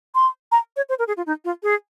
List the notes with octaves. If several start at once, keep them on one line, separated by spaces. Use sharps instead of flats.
C6
A#5
C#5
C5
A#4
G#4
F4
D#4
F4
G#4